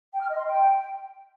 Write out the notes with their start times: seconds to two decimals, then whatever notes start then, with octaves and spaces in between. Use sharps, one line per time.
0.12 G5
0.21 F6
0.29 D#5
0.37 C6
0.45 G5